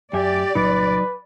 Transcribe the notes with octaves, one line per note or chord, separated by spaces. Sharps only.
F#2 G4 D5 E5 G#5
C2 A#2 C#3 F#3 D#4 B4